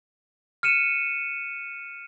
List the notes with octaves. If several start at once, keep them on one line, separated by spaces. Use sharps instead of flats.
F6 C#7 D#7 E7